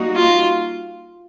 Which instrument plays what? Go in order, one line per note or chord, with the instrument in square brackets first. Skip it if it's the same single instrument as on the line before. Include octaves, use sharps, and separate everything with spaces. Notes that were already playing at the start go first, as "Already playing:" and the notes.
Already playing: [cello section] G3 A#3 D#4 F#4
[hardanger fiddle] F4